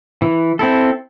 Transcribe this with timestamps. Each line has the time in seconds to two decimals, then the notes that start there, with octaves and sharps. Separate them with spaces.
0.22 E3
0.59 C4 E4 A4